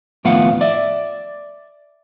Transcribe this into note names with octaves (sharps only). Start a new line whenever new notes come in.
D#2 A2 F3 B3 F5 F#5
D5 E5